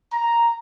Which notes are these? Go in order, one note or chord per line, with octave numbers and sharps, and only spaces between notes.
A#5